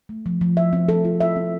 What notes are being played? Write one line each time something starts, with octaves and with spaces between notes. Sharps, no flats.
A3
F3
F3
E5
C4
A4
F4
E5
C4